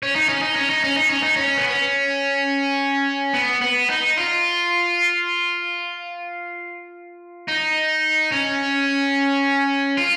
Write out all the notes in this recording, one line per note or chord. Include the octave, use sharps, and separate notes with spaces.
C#4
D#4
C#4
D#4
C#4
D#4
C#4
D#4
C#4
D#4
C#4
B3
C#4
B3
B3
D#4
F4
D#4
C#4
F4